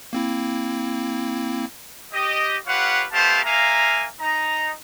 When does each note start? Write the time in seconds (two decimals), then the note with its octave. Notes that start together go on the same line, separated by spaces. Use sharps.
0.13 A#3 C4 E4
2.13 G4 D#5
2.67 F4 G4 B4 C#5 F5 F#5
3.13 A3 B3 G4 C5 F5 A5
3.44 A#3 E5 F5 G#5 A#5
4.21 D#4 A#5